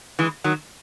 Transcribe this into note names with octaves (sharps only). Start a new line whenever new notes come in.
E3 G#3
D#3 F#3